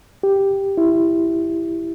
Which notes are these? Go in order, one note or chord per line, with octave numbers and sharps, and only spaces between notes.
G4
E4